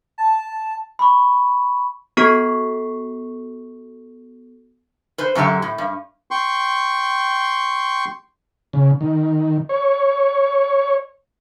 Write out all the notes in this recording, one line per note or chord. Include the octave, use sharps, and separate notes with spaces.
A5
B5 C#6
B3 F#4 A4 C#6 B6 C7
B4 C5
F#2 D3 F#3 B3 G4 E5
A2
G2
G5 C6 C#6
C#3
D#3
C#5